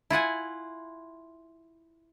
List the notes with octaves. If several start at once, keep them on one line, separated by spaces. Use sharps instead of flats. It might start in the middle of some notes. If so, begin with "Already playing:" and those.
E4 F4 F#5 G#5